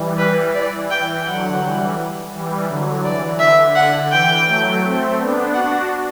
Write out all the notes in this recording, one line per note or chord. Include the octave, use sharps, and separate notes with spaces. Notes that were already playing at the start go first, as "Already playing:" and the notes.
Already playing: E3 G3
B4
E3 D5
E3 G5
D3 F#3 F#5
E3 G3
E3 G3
D3 F#3
E3 D5
D3 E5
D3 F#5
E3 G5
F#3 A3
A3 C4
B3 D4
D4 F#4 F#5